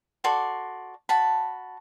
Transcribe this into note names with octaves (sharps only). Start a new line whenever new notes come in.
F#4 A4 D5 C6
F#4 A5 B5